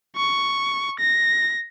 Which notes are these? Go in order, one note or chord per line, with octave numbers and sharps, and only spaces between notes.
C#6
A#6